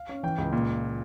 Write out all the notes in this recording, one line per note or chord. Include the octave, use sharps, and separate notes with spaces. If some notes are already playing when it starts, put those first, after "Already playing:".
Already playing: F5
C#4
E3 G5
C#2
A#2